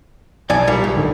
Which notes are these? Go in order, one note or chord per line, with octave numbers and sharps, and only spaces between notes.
B1 F2 D5 G#5
A#2 G3 A#3
C#2
G#2 D3 D#3